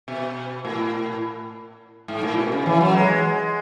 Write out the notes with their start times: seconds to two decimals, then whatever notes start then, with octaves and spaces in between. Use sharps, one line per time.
0.08 B2
0.65 A2
2.08 G#2
2.23 A2
2.37 B2
2.52 C#3
2.66 E3
2.81 F#3
2.94 G#3